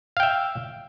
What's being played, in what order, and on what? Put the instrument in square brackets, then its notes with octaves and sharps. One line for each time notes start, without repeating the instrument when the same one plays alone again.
[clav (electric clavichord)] F5
G5
E5